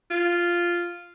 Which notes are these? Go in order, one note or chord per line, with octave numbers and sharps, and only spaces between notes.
F4